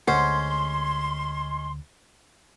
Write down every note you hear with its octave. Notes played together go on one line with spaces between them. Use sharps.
D2 G#3 C#4 C5 F#5 C6